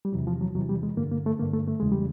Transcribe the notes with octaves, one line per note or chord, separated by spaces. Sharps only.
G3
E2 C3 E3 F#3
F3
F#3
E2 C3 E3 F#3
G3
G#3
G2 D3 A#3
A#3
A3
G2 D3 A#3
A3
A3
E2 C#3 E3 G#3
G3